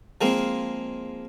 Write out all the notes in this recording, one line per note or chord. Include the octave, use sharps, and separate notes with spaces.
F3 G#3 A#3 C4